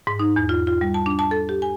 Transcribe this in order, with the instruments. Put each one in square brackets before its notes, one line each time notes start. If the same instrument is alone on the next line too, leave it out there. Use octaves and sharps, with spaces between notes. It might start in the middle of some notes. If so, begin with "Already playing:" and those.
[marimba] G#2
D#4
E2
F4
F4
G3
A5
D4
A5
A4
G4
G#5